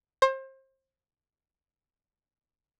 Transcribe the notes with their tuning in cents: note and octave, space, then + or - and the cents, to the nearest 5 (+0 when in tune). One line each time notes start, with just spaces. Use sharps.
C5 +30